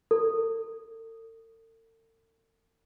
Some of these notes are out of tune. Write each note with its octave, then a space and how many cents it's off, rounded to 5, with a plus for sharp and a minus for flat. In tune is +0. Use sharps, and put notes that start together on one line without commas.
A4 +45